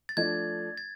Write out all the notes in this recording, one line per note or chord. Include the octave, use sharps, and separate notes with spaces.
A6
F3 A3 D4 G#6
A6